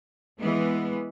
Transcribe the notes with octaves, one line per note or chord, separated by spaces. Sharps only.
E3 G#3 B3